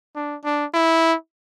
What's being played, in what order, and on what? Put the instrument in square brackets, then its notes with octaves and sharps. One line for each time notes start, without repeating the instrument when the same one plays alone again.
[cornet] D4
D4
E4